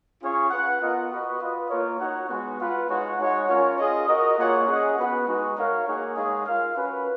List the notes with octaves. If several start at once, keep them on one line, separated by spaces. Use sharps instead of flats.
C#4 F4 G#4 C#5 F5
F4 B4 F#5
B3 F4 A#4 D#5 F#5
F#4 B4 D#5
F4 B4 D#5
A#3 F4 A#4 C#5
D#4 F#4 C#5 F#5
G#3 B3 F#4
F4 B4 F#5
G#3 D#4 F#4 C#5 F#5
G#3 D#4 F#4 C#5 F#5
C#4 F4 A#4 C#5
F4 G#4 D#5
F#4 A#4 D#5
A#3 F4 G#4 C#5 F#5
C#4 G#4 D#5 F#5
B3 F#4 B4 F#5
G#3 D#4 F#4
F#4 A#4 C#5 F5
A#3 D#4 G#4 C#5 F#5
G#3 D#4 G#4 C#5 F5
F4 A#4 F5
C#4 F#4 B4